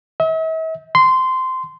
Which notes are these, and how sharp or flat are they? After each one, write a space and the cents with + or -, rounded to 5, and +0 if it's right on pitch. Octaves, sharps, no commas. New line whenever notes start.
E5 -45
C6 -15